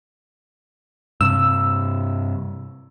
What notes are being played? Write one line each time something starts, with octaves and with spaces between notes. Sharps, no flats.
G2 C3 E6